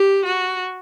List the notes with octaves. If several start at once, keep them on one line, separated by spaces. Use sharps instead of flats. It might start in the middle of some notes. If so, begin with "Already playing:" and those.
Already playing: G4
F#4